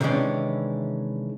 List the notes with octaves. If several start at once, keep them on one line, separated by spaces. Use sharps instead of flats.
C3 D#3 E3 G#3 C#4 D4